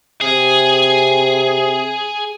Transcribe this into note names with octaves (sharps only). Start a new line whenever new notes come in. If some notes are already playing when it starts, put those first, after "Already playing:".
C3 G#4